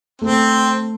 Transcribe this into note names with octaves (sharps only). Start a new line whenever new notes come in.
A3 C4